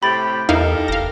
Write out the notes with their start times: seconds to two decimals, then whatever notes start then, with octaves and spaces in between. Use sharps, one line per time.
0.03 A2 C3 G4 B5 A6
0.49 E2 D#4 E4 G4 A4 A#4 F5
0.88 F#1 F5 A#6